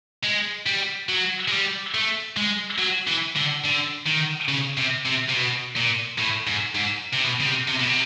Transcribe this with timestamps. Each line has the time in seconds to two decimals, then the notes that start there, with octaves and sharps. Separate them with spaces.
0.24 G#3
0.66 G3
1.08 F#3
1.48 G#3
1.52 G3
1.94 A3
2.37 G#3
2.78 F#3
3.07 E3
3.36 D3
3.64 D3
4.06 D#3
4.48 C#3
4.78 C3
5.05 C3
5.29 C3
5.34 B2
5.76 A#2
6.19 A2
6.47 G#2
6.75 G#2
7.13 C3
7.25 B2
7.41 C#3
7.46 C3
7.68 C3
7.80 B2
7.88 C3